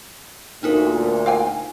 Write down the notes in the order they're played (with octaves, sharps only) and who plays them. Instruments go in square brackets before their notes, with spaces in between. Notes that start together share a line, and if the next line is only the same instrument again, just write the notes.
[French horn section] D2 A#2 [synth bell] D4 D#4 A#4
[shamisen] F5 G5 G#5